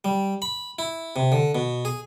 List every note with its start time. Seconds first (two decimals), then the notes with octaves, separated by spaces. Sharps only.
0.04 G3
0.42 B5
0.79 E4
1.16 C3
1.32 D3
1.55 B2
1.85 G#4